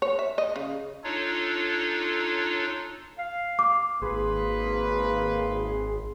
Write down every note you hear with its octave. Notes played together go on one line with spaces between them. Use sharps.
C#5
E5
D#5
C#3
D4 D#4 F4 A4 C#5
F5
D6
G#1 A#3 G#4 B4 C6